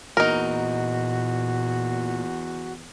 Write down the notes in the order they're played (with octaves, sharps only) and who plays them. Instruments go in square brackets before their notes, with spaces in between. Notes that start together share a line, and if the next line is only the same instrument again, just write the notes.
[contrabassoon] E2 [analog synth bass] A#2 [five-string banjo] D#4 A#4 [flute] F#4